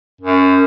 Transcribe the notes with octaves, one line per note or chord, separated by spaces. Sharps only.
F#2